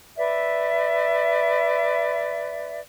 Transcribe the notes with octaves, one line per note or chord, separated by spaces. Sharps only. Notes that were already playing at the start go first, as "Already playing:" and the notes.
B4 D5 E5